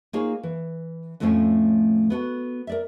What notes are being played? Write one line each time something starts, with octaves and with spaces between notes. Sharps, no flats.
A#3 D#4 F4 G#4 C#5
E3
F2 A2 F3 A3 C#4 F4
B3 F#4 A4
A#4 D5 E5